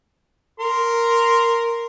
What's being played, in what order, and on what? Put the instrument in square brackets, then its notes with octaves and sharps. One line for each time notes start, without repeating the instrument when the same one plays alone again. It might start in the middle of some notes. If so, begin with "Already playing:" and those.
[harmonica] A#4 C6